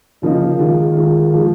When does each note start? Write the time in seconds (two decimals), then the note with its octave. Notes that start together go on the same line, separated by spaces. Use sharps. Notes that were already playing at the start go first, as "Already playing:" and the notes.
0.22 C#3 F3 A#3 D#4
0.59 D#3 G#3 F4
0.96 D#3 G#3 F4
1.34 F3 G#3 F4